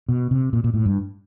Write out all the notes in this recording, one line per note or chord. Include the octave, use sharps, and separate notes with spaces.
B2
C3
A#2
A#2
A2
G2